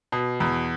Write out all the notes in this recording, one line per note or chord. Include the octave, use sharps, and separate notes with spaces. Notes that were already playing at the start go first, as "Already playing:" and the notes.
B2
E2